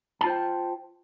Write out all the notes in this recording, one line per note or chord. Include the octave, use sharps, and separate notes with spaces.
F4 C5 G5 A5